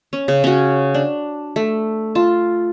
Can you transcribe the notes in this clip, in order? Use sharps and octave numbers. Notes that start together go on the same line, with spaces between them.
C#4
C#3
C#4 F#4
D4
A3
F4 A5